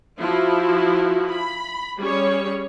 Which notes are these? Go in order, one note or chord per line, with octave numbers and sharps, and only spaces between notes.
F3 E4 F#4
B5
G3 C#4 G#4 C#5